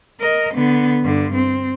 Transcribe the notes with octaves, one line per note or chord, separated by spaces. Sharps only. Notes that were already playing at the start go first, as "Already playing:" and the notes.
A#4 D#5
D3 B3
G2 D3
C4